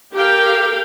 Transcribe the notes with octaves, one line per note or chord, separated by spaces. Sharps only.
G4 A4 A#4 F5 G5